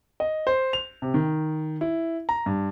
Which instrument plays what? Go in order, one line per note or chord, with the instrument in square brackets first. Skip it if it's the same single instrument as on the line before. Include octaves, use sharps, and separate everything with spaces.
[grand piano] D#5
C5
F7
C3
D#3
E4
A#5
G2